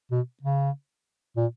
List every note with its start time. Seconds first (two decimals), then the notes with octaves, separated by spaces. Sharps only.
0.11 B2
0.42 C#3
1.37 A#2